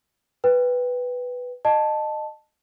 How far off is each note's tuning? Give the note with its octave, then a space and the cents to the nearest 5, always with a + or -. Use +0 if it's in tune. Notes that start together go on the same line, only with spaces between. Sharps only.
B4 +0 G5 +15
D#5 -25 A5 +0